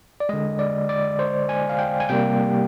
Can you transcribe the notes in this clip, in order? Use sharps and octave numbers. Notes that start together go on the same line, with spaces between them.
D5
D3 G#3 D#5
D5
D5
C5
G#5
F5
G5
G#5
C3 G3 A#3 G5